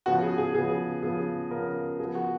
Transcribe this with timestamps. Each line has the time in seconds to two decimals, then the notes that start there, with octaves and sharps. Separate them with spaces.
0.06 C#3 F3 B3 F#4
0.22 G#4
0.38 G#4
0.55 C#3 F3 B3 G#4
1.03 C#3 F3 B3 G#4
1.50 C#3 F3 B3 A#4
1.99 F3 B3 G#4
2.15 F#4